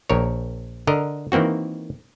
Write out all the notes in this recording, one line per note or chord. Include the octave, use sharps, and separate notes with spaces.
A#1 A#4 C#5
D3 A#4 D#5
D#3 E3 A#3 C4 F#4